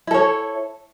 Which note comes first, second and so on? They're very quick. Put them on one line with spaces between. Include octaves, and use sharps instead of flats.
E4 A4 C#5